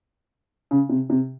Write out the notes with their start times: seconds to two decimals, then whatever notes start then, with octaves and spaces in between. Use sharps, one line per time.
0.71 C#3
0.89 C3
1.10 C3